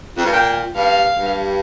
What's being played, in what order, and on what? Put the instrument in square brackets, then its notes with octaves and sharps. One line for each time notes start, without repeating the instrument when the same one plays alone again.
[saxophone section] F2
G2
[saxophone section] A#2 [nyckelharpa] G5
[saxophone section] G2 [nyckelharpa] F5
[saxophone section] G2